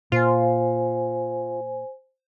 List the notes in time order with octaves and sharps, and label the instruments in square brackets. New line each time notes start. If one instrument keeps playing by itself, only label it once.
[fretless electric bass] A#2 [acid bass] F4 [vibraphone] C5 G#5